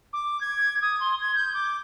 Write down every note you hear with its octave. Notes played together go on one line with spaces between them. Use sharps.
D6
G#6
D#6
C6
G#6
G6
D6